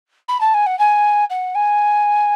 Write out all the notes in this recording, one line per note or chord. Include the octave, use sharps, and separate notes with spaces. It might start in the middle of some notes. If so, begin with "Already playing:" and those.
B5
A5
G#5
F#5
G#5
F#5
G#5